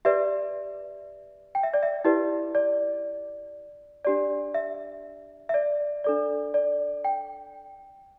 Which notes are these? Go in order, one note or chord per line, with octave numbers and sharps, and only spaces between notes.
G4 B4 D5 E5
G5
E5
D5
E5
E4 G4 B4 D5
D5
D4 G4 D5
E5
E5
D5
D4 A4 D5
D5
G5